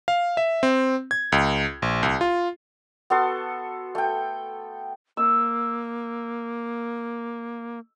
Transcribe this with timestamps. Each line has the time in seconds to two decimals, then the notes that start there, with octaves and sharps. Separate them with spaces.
0.08 F5
0.37 E5
0.63 C4
1.11 G#6
1.32 C#2
1.82 A#1
2.03 C2
2.21 F4
3.10 B3 F#4 A4 C6
3.95 A3 G5
5.17 A#3 E6